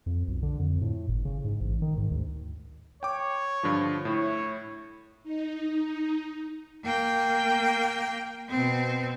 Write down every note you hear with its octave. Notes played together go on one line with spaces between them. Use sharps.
F2
B1
D3
F2
A2
G1
C#3
G#2
A1
D#3
G#2
D2
C#5 G5 D6
G2 D3 F3
A2 E4 C#5
D#4
A#3 G5
B2 C4